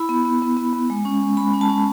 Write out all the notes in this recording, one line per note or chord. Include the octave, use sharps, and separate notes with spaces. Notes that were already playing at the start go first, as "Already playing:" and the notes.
Already playing: E4 B5
B3
B3
B3
B3
B3
G#3
C#4
G#3
G#3 B5
C#4
A5
C#4